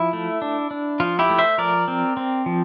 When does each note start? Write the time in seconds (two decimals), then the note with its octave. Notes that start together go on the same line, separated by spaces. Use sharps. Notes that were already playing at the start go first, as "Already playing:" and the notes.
Already playing: F3 E4
0.13 A3
0.42 D4
0.71 D4
1.00 F3 F4
1.19 E4 G4
1.30 A3
1.38 C5 E5
1.58 F3 A#4 D5
1.88 C4
2.17 C4
2.46 F3